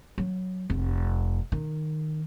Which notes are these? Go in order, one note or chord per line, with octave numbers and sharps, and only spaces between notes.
F#3
F1
D#3